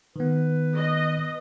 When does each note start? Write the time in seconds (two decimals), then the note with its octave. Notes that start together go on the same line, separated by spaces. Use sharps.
0.16 D#3 B3 B4
0.75 D#5